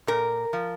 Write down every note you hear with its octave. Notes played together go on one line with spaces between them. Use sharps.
A#2 A#4
F3